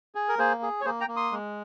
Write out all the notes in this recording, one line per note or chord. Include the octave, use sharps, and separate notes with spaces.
G#4
A#4
A#3 G#4 C5
G#4
C#5
A#3 G#4 C5
G5 A#5
A#3
C6 D#6
G#3